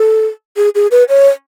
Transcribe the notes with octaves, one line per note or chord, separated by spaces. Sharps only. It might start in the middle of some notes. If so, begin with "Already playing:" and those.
Already playing: A4
G#4
G#4
B4
C#5